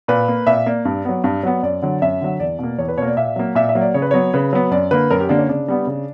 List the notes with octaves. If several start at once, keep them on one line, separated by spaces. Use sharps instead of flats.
A#2 B4
A#3
A#2 E5
A#3 D5
G2
F#3 B3
G2
F#3 B3
F#2 D5
D3 F#3
F#2 E5
D3 F#3
E2 D5
B2 A#3
E2 C#5
B4
B2 A#3 C#5
D5
A#2 E5
F#3 A#3
A#2 E5
E5
F#3 A#3
D5
C#3 C#5
B4
F#3 B3 C#5
C#3 B4
F#3 B3
F#2 D5
D3 A#3 B4
F#2 A#4
G4
D3 A#3 D4
C#4
C#3 D4
G3 B3
C#3